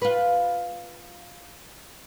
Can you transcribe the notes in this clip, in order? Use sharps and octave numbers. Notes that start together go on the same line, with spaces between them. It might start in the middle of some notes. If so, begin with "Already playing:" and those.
F4 B4